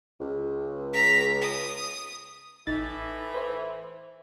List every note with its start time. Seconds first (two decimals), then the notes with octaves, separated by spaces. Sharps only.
0.20 C#2
0.93 A#5 B6
1.41 D#6
2.67 A1 A2 E3 D#4 A6
3.34 B4 C5 E5